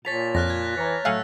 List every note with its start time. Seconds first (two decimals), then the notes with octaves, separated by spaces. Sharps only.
0.05 A#2 C#5 G#5 A5 A6 B6 F7
0.35 F2 F6 F#6 A#6
0.50 G#6
0.77 E3 C#5 A5 A#5
1.05 A2 F#3 A3 F5 F#5 G#5 E6